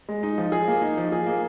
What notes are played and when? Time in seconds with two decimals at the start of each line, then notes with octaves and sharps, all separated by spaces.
0.09 G#3
0.23 D#4
0.38 F3
0.52 G#4
0.68 A#3
0.82 D#4
0.97 F3
1.12 G#4
1.26 A#3